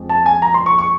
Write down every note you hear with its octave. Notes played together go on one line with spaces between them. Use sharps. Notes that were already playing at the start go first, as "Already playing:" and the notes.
Already playing: F2 G#3
A5
G#5
A#5
C6
C#6
C#6